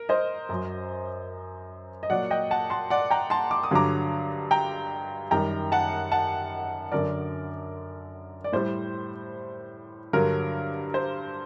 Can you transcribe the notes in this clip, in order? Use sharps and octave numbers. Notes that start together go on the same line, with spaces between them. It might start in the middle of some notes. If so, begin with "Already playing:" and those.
Already playing: A#4
C5 D#5
F#2 F#3
D#5
A#2 F#3 D5 F#5
D#5 G5
F#5 A5
A5 C6
D5 F#5
G5 A#5
A5 C6
D6
D#6
G2 D3 F#3 A#5 D6
G5 A#5
F#2 D#3 G3 G5 A#5
F#5 A5
F#5 A5
F#2 D3 F#3 A#4 D5
D5
A2 G3 C5
G2 D3 F#3 A#4
C5